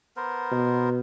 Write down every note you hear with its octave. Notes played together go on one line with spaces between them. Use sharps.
B3 A#4 C5
B2